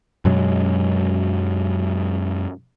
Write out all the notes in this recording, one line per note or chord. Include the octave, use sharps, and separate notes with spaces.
F#2 B2 F#3 G#3